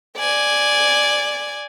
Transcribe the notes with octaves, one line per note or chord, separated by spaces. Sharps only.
D5 G#5